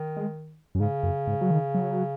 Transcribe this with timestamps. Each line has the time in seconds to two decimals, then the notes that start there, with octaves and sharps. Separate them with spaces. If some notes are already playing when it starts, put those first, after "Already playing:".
Already playing: D#3
0.17 G#3
0.75 F#2
0.80 G#2 C#3
1.03 F#2
1.27 G#2
1.41 F#3
1.51 D#3
1.75 F#3